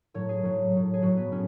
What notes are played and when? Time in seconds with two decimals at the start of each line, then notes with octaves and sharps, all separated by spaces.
0.14 A2 F#3 C#5
0.29 G#4
0.43 A2 F#3
0.73 A2 F#3
0.94 G#4
1.02 A2 F#3 F#4
1.17 B3
1.32 A2 C#4